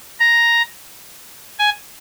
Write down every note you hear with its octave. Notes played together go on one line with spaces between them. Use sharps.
A#5
G#5